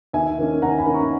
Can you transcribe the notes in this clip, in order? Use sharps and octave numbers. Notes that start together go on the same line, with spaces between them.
D#2 E5 G#5
D#3 A#3 C#4
D#2 F#5 A#5
G#5 B5
D#3 A#3 C#4
A#5 C#6